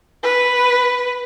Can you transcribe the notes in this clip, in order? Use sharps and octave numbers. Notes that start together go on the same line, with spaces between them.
B4